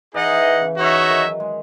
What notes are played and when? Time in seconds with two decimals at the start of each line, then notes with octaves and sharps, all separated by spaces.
0.14 E3 D#4 G#4 D#5 F#5
0.31 E3
0.46 E3
0.61 C#3
0.77 D#4 F#4 C#5 E5
1.09 D#3
1.24 F#3
1.40 G#3